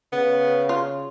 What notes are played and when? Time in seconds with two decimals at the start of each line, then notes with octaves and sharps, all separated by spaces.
0.13 C#3 B3
0.69 F4